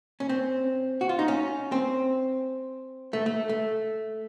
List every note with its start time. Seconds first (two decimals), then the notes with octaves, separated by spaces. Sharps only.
0.20 C#4
0.29 C4
1.01 F#4
1.09 F4
1.19 D#4
1.28 C#4
1.72 C4
3.13 A3
3.26 A3
3.49 A3